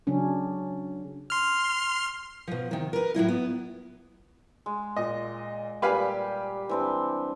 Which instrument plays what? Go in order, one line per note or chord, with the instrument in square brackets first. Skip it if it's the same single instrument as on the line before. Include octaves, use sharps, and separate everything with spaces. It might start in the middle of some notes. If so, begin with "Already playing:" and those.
[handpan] C#3 F#3 C#4 D4
[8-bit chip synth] C6 F6
[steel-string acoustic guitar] B2 F3
C3 D#3
A#4 B4
A2 F#3 E4 F4
B3
[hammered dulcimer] G#3
[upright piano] A#2 D#5
[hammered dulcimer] A#2 G3 [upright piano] G4 [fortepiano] B4 F5 G#5
[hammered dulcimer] E3 C4 D4